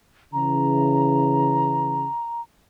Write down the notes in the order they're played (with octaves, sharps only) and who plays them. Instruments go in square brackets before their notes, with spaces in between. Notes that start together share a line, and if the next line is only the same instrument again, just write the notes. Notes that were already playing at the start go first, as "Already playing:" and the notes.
[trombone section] C#3 E3 [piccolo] A#5